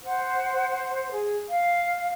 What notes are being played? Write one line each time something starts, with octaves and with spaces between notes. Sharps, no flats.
C5 F#5
G#4
F5